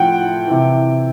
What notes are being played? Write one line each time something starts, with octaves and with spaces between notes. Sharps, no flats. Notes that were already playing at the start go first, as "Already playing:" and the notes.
Already playing: A2 F3 F#5 G5
C3 E3